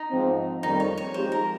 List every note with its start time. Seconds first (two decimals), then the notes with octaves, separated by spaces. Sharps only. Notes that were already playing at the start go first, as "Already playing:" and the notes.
Already playing: D#4
0.11 G#2 F3 C4
0.62 F2 D#3 G3 C4 D#4
0.80 C#5
0.98 C#5
1.14 F3 G#3 C4 D#4 G4 C5
1.32 A#4